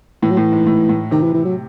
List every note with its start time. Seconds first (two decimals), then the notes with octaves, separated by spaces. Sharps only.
0.22 A2 E3
0.31 F#3
0.37 A2 E3
0.52 G#2
0.67 A2
0.89 A2
1.11 C3 D#3
1.23 E3
1.34 E3
1.45 F#3